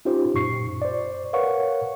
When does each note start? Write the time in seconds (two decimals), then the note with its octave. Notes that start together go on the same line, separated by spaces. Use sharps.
0.05 C#4 D#4 F4 G4 C5
0.34 F#2 A#2 C#6 C7
0.82 C5 D5
1.33 A#4 B4 C#5 F5 F#5 C#6